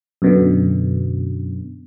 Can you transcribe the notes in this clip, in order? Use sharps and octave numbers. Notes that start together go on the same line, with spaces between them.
F#2 B2 D3